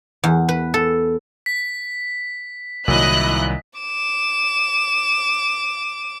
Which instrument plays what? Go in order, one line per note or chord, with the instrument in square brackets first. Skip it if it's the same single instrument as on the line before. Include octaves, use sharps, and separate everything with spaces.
[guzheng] E2
B4
A4
[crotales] B6
[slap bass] C2 D#3 [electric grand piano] A#2 F#3 [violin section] E4 D#5 F#6
[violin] D6 E7